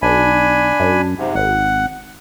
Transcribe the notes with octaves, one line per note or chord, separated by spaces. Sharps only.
B1 D4 G#5 B5
F#2
G#2 C3
G#1 F#5